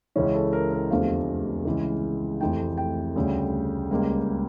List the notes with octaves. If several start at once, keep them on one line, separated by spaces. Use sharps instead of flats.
C#2 C#3 E3 C#4
A4
A#4
A#4
F1 E2 D3 F3 A3 F5
C#2 C#3 E3
F1 F2 E3 A3 G5
G5
D2 C#3 G3
C#2 C#3 G3 A#3